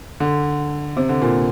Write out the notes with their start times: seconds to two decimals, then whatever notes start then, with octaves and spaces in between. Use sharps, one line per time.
0.20 D3
0.97 C3
1.09 D3
1.22 A#2